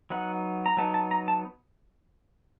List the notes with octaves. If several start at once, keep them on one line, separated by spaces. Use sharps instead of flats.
F#3 B3 D#4 F#5
A#5
F#3 B3 D#4 A5
A5
A#5
A5